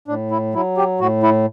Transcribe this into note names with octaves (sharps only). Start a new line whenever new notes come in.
A2 D4
E4
F#3 E4
G4
A2 F#4
E4